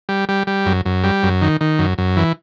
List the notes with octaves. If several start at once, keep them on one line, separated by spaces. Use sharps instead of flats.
G3
G3
G3
F#2
F#2
G3
F#2
D#3
D#3
F#2
F#2
E3